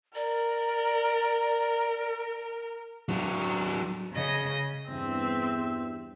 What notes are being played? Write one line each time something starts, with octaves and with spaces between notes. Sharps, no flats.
A#4 D5
F#3 D4
C#3 D#5
E2 G2 C4 E5